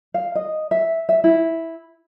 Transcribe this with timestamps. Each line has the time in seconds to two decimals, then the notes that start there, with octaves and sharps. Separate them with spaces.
0.14 F5
0.35 D#5
0.71 E5
1.09 E5
1.24 E4